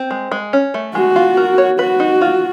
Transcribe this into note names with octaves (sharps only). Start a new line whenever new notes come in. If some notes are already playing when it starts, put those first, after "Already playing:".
Already playing: C4
G#3
G#3
C#4
A3
G#3 F#4
F4
A#4
C#5
F#4 B4
D#4
F4